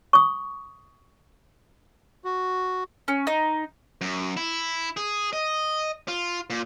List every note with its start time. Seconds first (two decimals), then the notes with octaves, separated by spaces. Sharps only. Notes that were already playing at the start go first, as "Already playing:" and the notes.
0.13 C#6 D#6
2.24 F#4
3.08 C#4
3.27 D#4
4.01 F#2
4.37 E4
4.97 G#4
5.33 D#5
6.08 F4
6.50 A#2